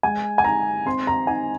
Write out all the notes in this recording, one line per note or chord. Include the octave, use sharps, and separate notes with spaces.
G#3 G#5
G#5
D#4 A#5
C4 C6
A#5
D#4 G#5